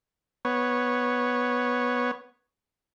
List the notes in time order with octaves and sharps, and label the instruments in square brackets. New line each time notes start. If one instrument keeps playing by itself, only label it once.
[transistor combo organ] B3 C#5